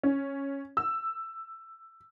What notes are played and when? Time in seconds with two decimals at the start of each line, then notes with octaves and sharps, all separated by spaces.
0.03 C#4
0.77 E6